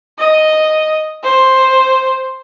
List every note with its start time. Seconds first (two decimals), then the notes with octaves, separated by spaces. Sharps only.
0.19 D#5
1.24 C5